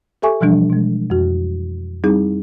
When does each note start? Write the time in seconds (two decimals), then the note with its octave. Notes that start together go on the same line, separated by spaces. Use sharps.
0.22 G4 A4 E5 G#5 C#6 D6
0.41 B2 E3 F3 G3 D4
0.70 B2 G#3
1.10 F2 F#4
2.04 G3 C4 D#4 E4 G#4